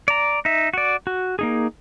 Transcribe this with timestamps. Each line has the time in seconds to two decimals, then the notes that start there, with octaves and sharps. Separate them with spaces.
0.08 D5 A#5
0.45 D#4 E5
0.74 F#4 D5
1.07 F#4
1.39 A#3 D#4 G#4